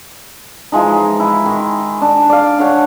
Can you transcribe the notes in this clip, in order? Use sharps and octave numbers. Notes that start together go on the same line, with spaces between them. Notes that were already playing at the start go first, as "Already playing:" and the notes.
E3 F3 G#3 D#4
E4
D#3
D4
D5 F5
D4 C#5 F#5